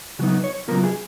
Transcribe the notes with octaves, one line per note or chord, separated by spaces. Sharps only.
C#3 F#3 B3 D#4 F#4
C#5
C#3 F#3 B3 F4 A#4
G#4